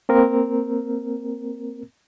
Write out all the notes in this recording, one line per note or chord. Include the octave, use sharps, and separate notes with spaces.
A#3 C4 A#4